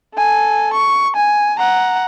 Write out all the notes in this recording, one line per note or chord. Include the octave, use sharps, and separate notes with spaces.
A4 G#5
C#6
G#5
F#5 A#5